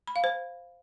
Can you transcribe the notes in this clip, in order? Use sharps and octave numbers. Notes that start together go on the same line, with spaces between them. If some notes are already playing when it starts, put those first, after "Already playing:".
B5
F5
C5